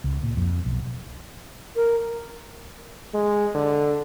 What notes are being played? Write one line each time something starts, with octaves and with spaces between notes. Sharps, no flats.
C#2
A#2
F2
B1
A#4
G#3
D3